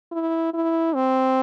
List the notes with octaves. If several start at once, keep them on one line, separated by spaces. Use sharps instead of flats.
E4
E4
C4